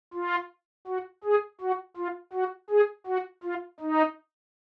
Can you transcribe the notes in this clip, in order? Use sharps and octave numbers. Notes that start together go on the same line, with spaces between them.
F4
F#4
G#4
F#4
F4
F#4
G#4
F#4
F4
D#4